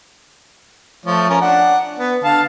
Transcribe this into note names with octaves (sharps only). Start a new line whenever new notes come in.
F3 A3 C#5
C#4 A#4
D4 F#5
B3
D3 F5 A5